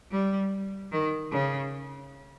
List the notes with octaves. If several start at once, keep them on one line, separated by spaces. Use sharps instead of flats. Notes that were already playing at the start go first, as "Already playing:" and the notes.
G3
D#3
C#3